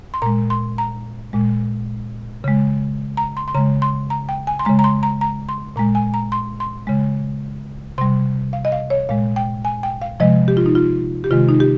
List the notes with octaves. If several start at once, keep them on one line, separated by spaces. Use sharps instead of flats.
C6
A#2 G#3 A#5
C6
A#5
A#2 G#3
C#3 G#3
A#5
C6
C6
C#3 G#3 A#5
C6
A#5
G5
G#5
C6
C#3 G#3 A#5
A#5
C6
A#5
A#5
C6
A#2 G#3 A#5
G#5
A#5
C6
C6
C#3 G#3
C3 G3 C6
F5
D#5
F5
C#5
A#2 G#3 F5
G5
G#5
G5
F5
C3 F3 G#3 D#5
G4
F4
D#4
F4
G4
C3 D#3 G#3 F4
D#4
G4